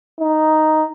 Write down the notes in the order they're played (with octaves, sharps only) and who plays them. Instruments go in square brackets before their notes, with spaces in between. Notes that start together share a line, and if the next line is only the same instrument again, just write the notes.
[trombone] D#4